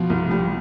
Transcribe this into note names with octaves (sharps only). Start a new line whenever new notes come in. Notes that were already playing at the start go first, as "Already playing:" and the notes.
Already playing: B2 F3
C2
G3